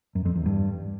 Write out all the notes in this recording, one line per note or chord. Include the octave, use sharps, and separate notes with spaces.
F#2
F2
E2
G2